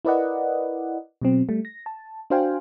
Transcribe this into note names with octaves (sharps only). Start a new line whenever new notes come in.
E4 A#4 B4 D5 D#5 F#5
B2 F#3 C4
G3 A3
A#6
A5
D4 F#4 C5 F5 G5 G#5